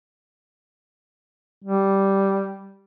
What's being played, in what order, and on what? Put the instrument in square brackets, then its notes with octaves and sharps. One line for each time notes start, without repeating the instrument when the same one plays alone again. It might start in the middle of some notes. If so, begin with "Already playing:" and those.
[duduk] G3